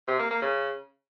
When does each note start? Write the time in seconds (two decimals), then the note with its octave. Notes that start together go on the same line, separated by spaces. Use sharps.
0.08 C3
0.19 A#3
0.31 A#3
0.42 C#3